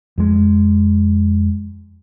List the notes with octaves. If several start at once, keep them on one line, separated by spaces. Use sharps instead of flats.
F2 G#3